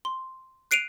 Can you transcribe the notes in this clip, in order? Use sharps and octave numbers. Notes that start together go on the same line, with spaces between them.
C6
F#6 C7 D7 D#7 F7